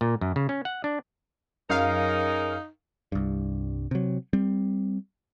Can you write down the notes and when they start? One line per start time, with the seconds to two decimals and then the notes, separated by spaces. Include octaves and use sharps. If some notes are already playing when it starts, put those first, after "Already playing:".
0.01 A#2
0.21 F#2
0.36 C#3
0.49 C#4
0.65 F#5
0.84 D4
1.70 F#2 C#4 D#4 G#4 A#4 F5
3.12 C2 G2
3.91 C3 F#3
4.33 G3 C4